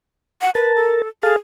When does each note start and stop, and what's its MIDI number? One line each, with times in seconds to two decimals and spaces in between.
0.42 0.50 78
0.55 1.02 70
0.55 0.72 71
0.55 1.02 81
0.76 1.08 69
1.23 1.35 68
1.23 1.36 69
1.23 1.36 77
1.23 1.36 81